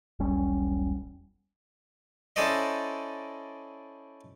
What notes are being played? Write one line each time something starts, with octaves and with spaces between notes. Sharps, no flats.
E1 B1 G3 C#4
C#4 E4 A4 C5 D5 D#5